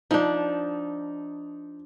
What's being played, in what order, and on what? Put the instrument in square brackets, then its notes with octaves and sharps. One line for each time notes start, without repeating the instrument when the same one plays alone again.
[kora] F3 D4 [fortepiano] D#4